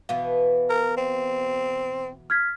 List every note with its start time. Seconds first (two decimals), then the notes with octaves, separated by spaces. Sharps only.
0.09 B2 E3 B3 F5
0.70 A#4
0.97 C4
2.30 F6 G#6 B6